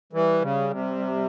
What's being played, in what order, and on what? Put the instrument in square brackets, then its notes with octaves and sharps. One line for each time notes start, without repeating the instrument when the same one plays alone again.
[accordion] E3 [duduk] G3
[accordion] C#3
C3